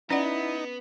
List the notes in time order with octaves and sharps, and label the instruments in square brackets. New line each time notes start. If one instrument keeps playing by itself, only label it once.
[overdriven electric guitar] B3 [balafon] C#4 D5 F#5 [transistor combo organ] D#4 [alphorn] E4